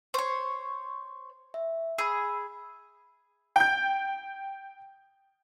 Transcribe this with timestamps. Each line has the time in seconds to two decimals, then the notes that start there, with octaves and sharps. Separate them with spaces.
0.14 C5 C#5 C#6
1.54 E5
1.98 G#4 B5 E6
3.56 G5 G6